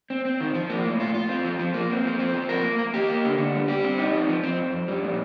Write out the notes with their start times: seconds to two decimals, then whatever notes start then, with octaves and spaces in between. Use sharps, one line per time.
0.10 C4
0.25 C4
0.40 D#3
0.54 F3
0.69 A#3
0.85 A2
1.00 F4
1.14 F4
1.29 C4
1.45 F3
1.59 F3
1.74 A#3
1.90 C4
2.05 F3
2.19 C4
2.34 F3
2.49 A#4
2.63 A#3
2.78 A#3
2.94 G4
3.10 A#3
3.24 D3
3.38 D3
3.54 G3
3.68 G4
3.84 C4
3.98 D#4
4.14 F3
4.29 F3
4.43 C4
4.58 F2
4.73 F2
4.88 G3
5.03 A#2